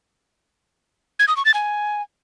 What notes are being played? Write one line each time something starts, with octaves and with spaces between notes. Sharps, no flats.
G#6
D#6
C#6
A6
G#5